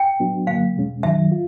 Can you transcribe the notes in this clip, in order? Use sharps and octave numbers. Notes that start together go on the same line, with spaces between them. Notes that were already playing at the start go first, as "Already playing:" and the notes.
Already playing: G5
A2 F#3 B3 D4 F#4
F#2 D3 F#3 A#3 F5
E2 B2 G#3 C#4
F#2 D#3 F#3 E5
F4